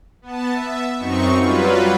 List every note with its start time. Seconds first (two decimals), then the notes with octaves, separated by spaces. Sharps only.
0.22 B3 A5
0.51 E5
0.99 F#2 C4 D#4 C#6
1.40 F#3 G3 F4 B4